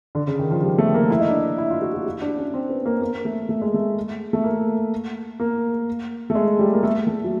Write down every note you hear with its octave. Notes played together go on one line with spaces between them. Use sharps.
D3
C#3
D#3
F3
G3
A3
A#3
E4
D#4
D4
D#4
E4
F4
F#4
F#4
F#4
D4
C#4
C4
B3
A#3
A#3
A3
A3
G#3
A3
A3
A#3
A#3
A3
G#3
G3
A#3
A3
A3
F#3